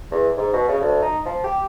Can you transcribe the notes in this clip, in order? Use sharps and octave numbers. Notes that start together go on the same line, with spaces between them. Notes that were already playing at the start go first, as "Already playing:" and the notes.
E2
G#2
B2
C#3
D2
D#4
F3
G4